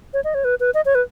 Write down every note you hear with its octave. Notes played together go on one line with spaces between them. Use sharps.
C#5
D#5
C#5
B4
B4
D#5
C#5
B4